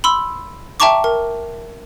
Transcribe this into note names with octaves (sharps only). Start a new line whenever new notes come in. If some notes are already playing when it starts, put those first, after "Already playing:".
B5 C6 E6
E5 G5 A5 A#5 C#6 D6
A#4